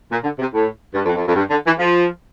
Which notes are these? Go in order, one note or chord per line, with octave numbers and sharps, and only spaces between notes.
A#2
D3
C3
A2
G2
F2
F2
F2
G2
D3
E3
F3